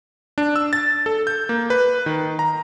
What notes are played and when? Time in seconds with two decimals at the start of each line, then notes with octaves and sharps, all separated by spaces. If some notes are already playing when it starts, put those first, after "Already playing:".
0.38 D4
0.56 E6
0.73 A6
1.06 A4
1.27 G6
1.49 A#3
1.70 B4
2.06 D#3
2.39 A#5